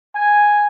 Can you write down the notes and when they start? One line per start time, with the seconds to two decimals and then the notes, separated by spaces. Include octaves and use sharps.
0.15 G#5